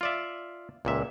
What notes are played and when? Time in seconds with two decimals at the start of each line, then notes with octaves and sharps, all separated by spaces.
0.01 F4 D5 E5
0.85 C#2 A#2 E5